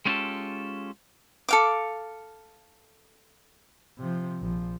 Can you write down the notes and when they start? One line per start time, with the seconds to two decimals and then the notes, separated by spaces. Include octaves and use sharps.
0.05 G#3 B3 C#4 F4 G4 A4
1.49 A4 F5 D6
3.99 C3 F3
4.41 A#1 F3